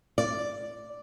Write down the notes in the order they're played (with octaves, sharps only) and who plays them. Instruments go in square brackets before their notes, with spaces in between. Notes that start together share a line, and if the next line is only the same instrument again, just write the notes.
[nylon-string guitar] D5